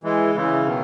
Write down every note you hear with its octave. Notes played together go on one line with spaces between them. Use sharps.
E3 G#3
C#3 E3
B2 D#3